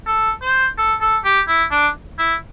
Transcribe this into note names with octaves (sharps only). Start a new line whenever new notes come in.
A4
C5
A4
A4
G4
E4
D4
E4